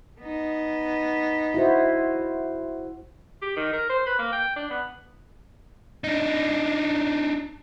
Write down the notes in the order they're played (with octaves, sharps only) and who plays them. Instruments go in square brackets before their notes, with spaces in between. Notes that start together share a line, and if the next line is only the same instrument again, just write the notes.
[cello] B3 D#4
[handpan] E4 F#4 C5
[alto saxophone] G4
D#3
A#4
C5
B4
A#3
G5
D4
B3
[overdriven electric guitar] D4 D#4